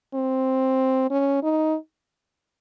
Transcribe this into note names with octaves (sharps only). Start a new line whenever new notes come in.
C4
C#4
D#4